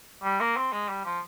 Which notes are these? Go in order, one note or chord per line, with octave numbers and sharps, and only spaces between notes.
G3
A#3
C4
G#3
G3
F3